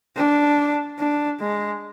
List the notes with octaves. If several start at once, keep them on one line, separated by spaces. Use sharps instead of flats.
D4
D4
G#3